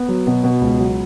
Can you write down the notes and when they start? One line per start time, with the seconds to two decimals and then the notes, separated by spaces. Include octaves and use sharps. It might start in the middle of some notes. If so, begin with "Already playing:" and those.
Already playing: B3
0.09 F#3
0.27 B2
0.44 B2
0.61 C#2
0.79 F#3